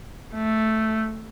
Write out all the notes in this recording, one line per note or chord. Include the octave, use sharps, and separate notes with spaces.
A3